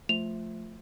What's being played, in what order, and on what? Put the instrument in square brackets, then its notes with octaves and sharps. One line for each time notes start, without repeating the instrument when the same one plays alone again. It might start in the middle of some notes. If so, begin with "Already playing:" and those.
[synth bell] F3 A3 F4 [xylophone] F7